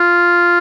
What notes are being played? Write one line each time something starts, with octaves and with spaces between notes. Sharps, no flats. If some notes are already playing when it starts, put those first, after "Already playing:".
Already playing: F4